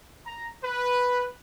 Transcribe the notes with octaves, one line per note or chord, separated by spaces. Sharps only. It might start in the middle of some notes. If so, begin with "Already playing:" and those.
A#5
B4